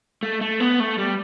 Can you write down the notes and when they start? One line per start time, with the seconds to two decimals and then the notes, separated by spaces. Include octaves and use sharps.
0.23 A3
0.41 A3
0.60 B3
0.80 A3
0.98 G3